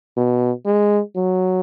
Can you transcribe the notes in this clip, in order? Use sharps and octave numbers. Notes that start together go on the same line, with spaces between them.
B2
G#3
F#3